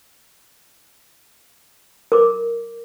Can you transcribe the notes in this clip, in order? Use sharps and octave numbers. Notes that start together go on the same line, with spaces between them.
A#4 D6